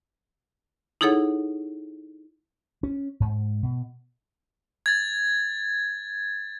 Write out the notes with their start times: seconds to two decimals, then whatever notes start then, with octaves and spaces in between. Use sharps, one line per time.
1.01 D#4 E4 G#4 A4 C#5 F#5
2.83 C#4
3.20 G#2
3.63 B2
4.86 G#6 A6